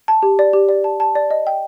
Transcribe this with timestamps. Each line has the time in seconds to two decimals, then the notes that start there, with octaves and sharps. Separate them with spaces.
0.08 A5
0.23 G4
0.39 D5
0.53 G4
0.69 D5
0.84 A5
1.00 A5
1.15 D5
1.31 D#5
1.47 G5